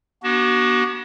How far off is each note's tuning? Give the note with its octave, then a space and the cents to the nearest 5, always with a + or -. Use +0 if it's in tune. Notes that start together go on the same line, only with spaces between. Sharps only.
B3 -40 D4 +0 F#4 +30